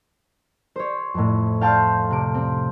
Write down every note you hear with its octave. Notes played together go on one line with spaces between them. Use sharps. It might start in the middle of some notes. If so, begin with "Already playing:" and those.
C5 C#5
F2 A2
F5 G5 A5 C6 F6 G6
C3 D7
C4